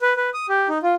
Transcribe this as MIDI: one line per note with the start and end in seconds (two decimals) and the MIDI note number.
0.02 0.13 71
0.17 0.30 71
0.34 0.46 87
0.49 0.68 67
0.69 0.78 63
0.83 0.95 65